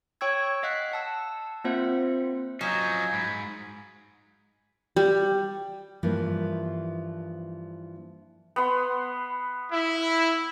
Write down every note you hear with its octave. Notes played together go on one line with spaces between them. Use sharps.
C#5 G5 C#6 E6 G#6
D#5 F5 F#5 F#6 B6
F#5 A5 E6
A#3 C4 F4 C5 E5 F#5
F3 F#3 C#4 D#5 G#5
G#2 B5
G3
G2 E3 F3 A#3
B3 C6
E4